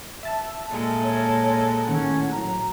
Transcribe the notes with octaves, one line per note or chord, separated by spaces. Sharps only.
E5 A5
A#2 G#3 A4
C#5
A2 D#3 C#4 F#5
A2 F#3 A#5